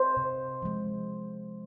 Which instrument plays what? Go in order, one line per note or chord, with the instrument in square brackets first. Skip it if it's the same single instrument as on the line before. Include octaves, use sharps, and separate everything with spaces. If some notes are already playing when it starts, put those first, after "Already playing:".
Already playing: [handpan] C5
C3
F3 G#3